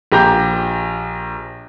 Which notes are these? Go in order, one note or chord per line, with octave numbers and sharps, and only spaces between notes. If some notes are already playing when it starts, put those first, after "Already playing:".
A#1 G4 A#5 G6